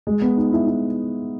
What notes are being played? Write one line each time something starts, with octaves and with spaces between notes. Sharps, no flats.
G#3
B3
D#4
E4
E4